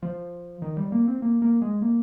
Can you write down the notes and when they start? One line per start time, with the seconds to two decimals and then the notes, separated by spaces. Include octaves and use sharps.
0.03 F3
0.62 D#3
0.77 G3
0.92 A#3
1.08 C4
1.22 A#3
1.42 A#3
1.62 G#3
1.82 A#3